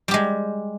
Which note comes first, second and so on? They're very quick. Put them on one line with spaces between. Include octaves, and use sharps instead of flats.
G3 G4 G#3